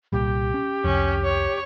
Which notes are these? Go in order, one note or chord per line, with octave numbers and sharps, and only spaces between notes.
C2 A#2 G3 G4
C#4
C2 F2 C#4
C#5